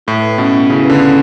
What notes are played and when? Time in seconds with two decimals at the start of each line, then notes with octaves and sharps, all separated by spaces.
0.07 A2 E4
0.22 B4
0.38 B2 C#4
0.54 C#4
0.69 C#3 E4
0.85 D3 B4
1.01 C#4